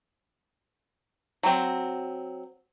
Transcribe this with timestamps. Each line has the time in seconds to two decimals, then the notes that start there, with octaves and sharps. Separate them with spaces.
1.43 F#3 C4